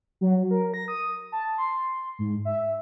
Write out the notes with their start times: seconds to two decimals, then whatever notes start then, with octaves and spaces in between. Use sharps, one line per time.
0.21 F#3
0.51 A#4
0.74 A#6
0.88 D#6
1.32 A5
1.58 C6
2.19 G#2
2.45 E5